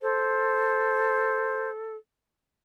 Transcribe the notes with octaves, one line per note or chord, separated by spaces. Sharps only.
A4 C5